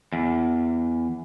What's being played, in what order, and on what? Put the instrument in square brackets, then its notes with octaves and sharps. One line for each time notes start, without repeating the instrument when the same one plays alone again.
[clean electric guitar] E2